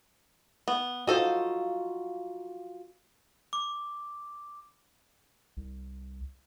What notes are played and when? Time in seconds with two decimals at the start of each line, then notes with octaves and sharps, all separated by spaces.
0.68 B3
1.07 D#4 F4 F#4 A4 C5
3.53 D6
5.57 C2